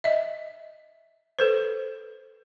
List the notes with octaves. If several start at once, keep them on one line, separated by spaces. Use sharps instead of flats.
D#5 E5
A4 B4 C5